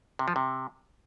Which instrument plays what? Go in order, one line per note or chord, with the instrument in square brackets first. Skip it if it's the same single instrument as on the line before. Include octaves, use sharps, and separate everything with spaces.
[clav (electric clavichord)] C3
F3
C3